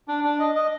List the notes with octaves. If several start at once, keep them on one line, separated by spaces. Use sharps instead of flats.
D4
D4
D#5
D#5